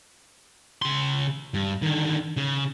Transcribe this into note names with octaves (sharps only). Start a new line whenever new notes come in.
C#3 C6
G2
D3 D#3
C#3